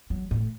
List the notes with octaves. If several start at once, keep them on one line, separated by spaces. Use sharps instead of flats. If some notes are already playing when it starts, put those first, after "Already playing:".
F#3
A2